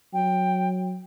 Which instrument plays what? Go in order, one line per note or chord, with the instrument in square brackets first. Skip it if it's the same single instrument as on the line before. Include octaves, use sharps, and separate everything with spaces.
[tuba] F#3 [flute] G5